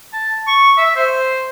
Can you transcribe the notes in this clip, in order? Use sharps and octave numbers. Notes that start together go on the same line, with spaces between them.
A5
C#6
E5
C5